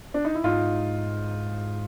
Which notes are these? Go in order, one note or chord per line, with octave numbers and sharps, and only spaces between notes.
D4
D#4
E4
G#2 D#4 F4